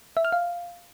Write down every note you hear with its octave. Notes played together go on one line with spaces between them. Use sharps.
E5
F6
F5